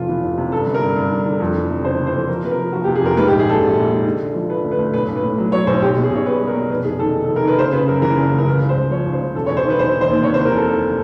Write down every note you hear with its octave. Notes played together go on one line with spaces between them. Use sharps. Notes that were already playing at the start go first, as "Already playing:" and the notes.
Already playing: F1 F2 C3 F4
E3
F1
C3
G2 A4
G1
A#4
G2
G2
D3
D3
F2
E3
C3
F#1 C5
E3
C5
F2
F3 A#4
C3 B4
A#4
F3
F3 F#4
G4
C3
G#4
F2 A#4
G#2 B4
G4
A#1
G#4
A#1 A4
A#1
A#1
G#2
D3
D3
F3
D3 B4
D2
B4
D2
B1 B4
B1
B4
A2
F#3
F#3 C#5
B1 C5
B1 G4
B2
G#4
B1 C#5
G3 B4
G3
A#4
B2
F1 B4
F1 G#4
D#3 A4
D#3
A4
F1
A#4
D#3 B4
C#3 C5
C#3 B4
F#2 A#4
E3 A#4
F#1
C#3
A#4
C#2 B4
C#2
C5
C#2
F3 C#5
C#2
C5
C#3
E1 A4
C#5
E1
C5
D#3
B4
E1 C5
D#3
C5
D#2
C3 C#5
C5
E3
A#4
F1 A4
F1 A4